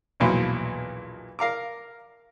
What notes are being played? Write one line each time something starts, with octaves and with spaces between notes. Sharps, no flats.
B1 E2 A#2 F3 F#3
A#4 F5 A#5 D6